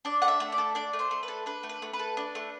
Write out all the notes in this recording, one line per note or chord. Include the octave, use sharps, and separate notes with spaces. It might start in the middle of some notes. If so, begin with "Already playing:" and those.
D4 D5
A3 F#5
E5
A3
D5
A4
D4 D5
A3
C5
A3
B4
A4
D4 B4
A3
B4
A3
B4
A4
D4
A3